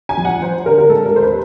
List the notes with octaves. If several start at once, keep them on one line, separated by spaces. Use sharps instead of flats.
G#5
F3
F#5
F3 C5
D3 A#4
A#4
G#3 A4
A#4
D#2 C5
B4